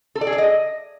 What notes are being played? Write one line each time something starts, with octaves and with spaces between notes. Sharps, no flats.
A4
D5
G#4
D5
D#5